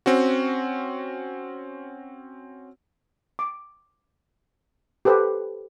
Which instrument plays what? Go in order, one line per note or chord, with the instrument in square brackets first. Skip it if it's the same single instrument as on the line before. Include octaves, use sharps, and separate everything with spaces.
[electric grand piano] C4 C#4 F#4
[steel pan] D6
G4 A4 B4 C5